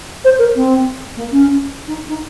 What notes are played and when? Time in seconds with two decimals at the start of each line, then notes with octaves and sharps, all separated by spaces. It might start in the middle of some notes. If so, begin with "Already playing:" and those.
0.24 C5
0.38 A#4
0.55 C4
1.16 A#3
1.31 C#4
1.87 D#4
2.08 D#4